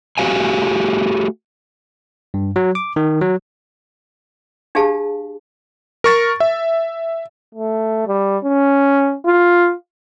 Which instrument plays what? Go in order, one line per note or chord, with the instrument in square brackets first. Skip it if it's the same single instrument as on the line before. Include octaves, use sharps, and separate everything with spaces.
[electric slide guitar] A3 F#4 G4 F5 G#5
[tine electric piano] G2
F#3
D6
D#3
F#3
[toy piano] D4 G4 G#4 F5 A5
[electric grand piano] A#4 C#6 A6
E5
[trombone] A3
G3
C#4
F4